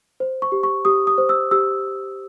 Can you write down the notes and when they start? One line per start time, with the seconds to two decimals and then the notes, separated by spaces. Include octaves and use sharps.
0.20 C5
0.42 C#6
0.52 G4
0.63 C#6
0.85 G4 D#6
1.07 D#6
1.18 C5
1.29 E6
1.51 G4 E6